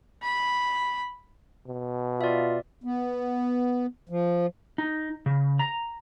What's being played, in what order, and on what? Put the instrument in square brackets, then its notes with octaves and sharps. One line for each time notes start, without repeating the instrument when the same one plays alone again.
[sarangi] B5
[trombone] B2
[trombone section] F4 [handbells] D5 E5
[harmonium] B3
F3
[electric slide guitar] D#4
C#3
A#5